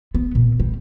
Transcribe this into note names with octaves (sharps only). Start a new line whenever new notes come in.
B3
A#2
G3